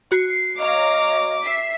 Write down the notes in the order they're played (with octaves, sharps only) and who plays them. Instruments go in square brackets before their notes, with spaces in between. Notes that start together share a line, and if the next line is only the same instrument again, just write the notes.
[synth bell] F#4 [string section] C7
[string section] C#5 F5 A#5 [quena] D#5 [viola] D6
[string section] E5 B6 C7